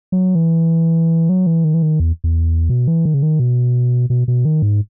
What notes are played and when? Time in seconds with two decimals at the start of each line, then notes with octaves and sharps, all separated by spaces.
0.12 F#3
0.35 E3
1.29 F#3
1.47 E3
1.64 D#3
1.74 E3
1.82 D#3
2.00 E2
2.24 E2
2.69 B2
2.88 E3
3.05 D#3
3.14 C#3
3.23 D#3
3.40 B2
4.10 B2
4.28 B2
4.45 D#3
4.62 G#2